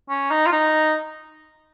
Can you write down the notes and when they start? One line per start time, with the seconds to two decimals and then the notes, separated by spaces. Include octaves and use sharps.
0.09 C#4
0.31 D#4
0.46 F4
0.52 D#4